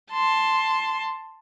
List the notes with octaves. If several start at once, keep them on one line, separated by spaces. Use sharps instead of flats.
A5 C6